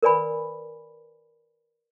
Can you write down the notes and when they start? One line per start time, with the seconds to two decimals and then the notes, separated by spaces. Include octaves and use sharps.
0.03 A#4 B4 D5 G#5 B5